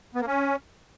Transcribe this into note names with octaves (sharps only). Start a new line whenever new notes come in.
B3
A#3
C#4